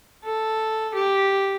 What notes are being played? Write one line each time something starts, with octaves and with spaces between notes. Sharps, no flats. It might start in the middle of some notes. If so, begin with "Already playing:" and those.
A4
G4